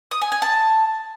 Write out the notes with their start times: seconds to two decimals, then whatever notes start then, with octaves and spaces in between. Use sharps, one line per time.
0.11 D#6
0.22 G#5
0.32 G#5
0.42 A5